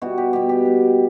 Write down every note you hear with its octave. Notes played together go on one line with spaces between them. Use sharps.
B2 G3 F#4
G4
B2 G3 G4
G4
B2 G3